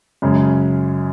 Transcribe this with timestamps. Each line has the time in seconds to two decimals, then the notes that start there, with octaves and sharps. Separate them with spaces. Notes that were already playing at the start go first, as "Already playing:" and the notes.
0.22 F#2 C#3 G#3 C#4